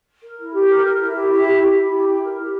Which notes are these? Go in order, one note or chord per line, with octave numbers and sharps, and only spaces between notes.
A#4
E4
G4
A#4
A#4
E4
G4
E4
G4
G4
E4
G4
E4
A#4
G4